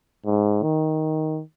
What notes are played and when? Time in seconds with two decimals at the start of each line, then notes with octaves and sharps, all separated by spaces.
0.26 G#2
0.63 D#3